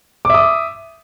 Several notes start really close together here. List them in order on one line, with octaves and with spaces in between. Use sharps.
D6 E5 D#6